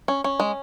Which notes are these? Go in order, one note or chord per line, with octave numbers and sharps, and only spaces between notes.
C#4
C#4
G#3